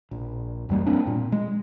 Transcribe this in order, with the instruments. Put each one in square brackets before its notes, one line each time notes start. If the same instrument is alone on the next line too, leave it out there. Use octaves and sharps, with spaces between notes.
[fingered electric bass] A#1
F#1 E2 G3 A#3
A#3 C4 D4
A#2
G#3